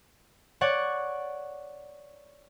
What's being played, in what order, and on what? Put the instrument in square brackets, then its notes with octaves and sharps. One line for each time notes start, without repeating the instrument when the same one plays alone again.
[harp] C#5 D5 F#5 C#6